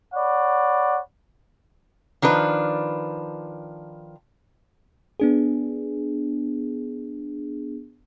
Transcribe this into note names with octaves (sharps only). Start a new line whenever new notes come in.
C#5 D5 F#5 B5
D#3 F3 D4 B4
B3 D4 G#4